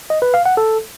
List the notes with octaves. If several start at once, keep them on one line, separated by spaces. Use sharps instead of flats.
D#5
B4
F5
F#5
A4